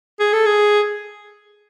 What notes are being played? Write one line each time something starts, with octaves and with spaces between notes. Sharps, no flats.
G#4
A4
G#4